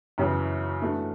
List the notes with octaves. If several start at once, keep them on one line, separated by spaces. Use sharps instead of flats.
F#2 C#3 E3
E3 A3 D4 F#4